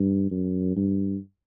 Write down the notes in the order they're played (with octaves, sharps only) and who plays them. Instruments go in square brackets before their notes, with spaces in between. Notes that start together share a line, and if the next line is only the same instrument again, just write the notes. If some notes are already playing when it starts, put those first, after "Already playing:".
Already playing: [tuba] G2
F#2
G2